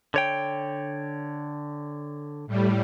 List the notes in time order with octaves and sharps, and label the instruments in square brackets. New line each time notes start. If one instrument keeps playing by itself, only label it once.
[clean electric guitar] D3 C#5 G5
[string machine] A2 G3